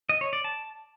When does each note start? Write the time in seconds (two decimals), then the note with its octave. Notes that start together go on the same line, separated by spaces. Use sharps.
0.09 D#5
0.21 C#5
0.33 D5
0.44 A5